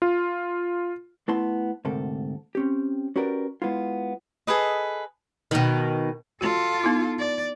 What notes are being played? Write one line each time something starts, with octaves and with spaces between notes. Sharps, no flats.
F4
A3 B3 E4 A5 C6
D2 G#2 C3 A4 A#4
C4 C#4 G4
C#4 F#4 G4 A#4 B4 D5
G#3 B3 E4 F4
G#4 A4 B4 D#5
B2 D#3
F4 F#4 A4
B3 D#4 E4
D5